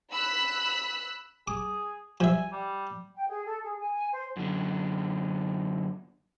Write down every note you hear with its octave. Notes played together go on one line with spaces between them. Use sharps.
B5 E6 F#6 B6
G#4 D6
F3 E5 G#5
G3
G5
G#4
A4
G#4
G#5
G#5
C5
F#2 D3